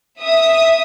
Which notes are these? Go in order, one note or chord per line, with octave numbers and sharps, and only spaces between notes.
E5 D#6